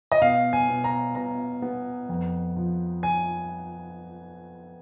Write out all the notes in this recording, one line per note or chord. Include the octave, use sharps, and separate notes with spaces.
D#5
B2 F5
G#5
B2
A#5
B2 A#5
B3
F2
F3
G#5